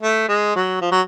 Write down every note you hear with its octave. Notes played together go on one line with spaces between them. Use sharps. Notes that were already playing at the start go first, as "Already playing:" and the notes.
A3
G#3
F#3
F3
F#3